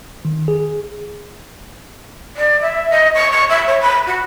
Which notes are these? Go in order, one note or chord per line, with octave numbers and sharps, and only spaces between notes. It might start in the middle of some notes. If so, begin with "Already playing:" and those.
D#3
G#4
D5
E5
D#5
C#6
C#6
E5
C#5
B5
F#4